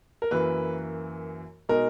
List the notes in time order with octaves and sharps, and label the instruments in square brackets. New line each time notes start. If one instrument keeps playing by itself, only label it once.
[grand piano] A#4
[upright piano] F#2 E3 A#3 [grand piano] B4
[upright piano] B2 G#3 D#4 [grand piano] A#4